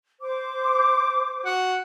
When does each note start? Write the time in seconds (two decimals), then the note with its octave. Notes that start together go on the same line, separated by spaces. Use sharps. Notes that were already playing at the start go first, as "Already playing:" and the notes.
0.21 C5 D6
1.45 F#4